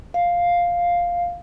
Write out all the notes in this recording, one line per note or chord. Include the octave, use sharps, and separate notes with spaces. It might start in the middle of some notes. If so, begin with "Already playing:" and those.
F5